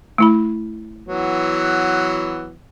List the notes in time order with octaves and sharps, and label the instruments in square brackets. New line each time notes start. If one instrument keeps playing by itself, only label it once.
[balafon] A3 E4 B5
[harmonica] E3 F#3 B3